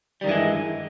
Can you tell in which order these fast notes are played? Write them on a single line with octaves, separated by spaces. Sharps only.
G3 D#3 G2 E3 G#3